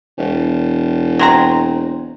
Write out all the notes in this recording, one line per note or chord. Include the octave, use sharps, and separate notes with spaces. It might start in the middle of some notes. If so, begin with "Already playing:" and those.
E1
F#3 C4 A#5